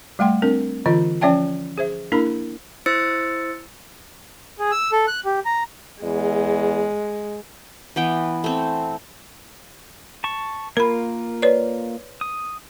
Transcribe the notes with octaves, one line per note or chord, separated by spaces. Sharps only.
G3 A3 F#5 G5 C6
C4 D4 A#4
D3 E3 F4 D#5
F3 C#4 D5 E5 G5 A5
G#4 C5 E5
A#3 D4 E4 A#4 A#5 B5
E4 C5 E6 A6 C#7
G#4
E6
A4
F#6
G4
A#5
E2 G#3
E3 B3 G5
A3 C4
A5 C#6
A#3 F4 A#4 B5
B4 C#5 D5
D#6